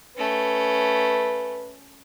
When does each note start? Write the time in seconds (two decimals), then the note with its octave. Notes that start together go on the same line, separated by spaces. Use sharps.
0.17 A3 C#4 B4